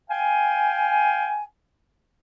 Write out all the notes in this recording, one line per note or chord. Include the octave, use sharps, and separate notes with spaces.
F5 G5 G#5